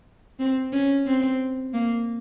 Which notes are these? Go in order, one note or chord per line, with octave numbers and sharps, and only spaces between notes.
C4
C#4
C4
A#3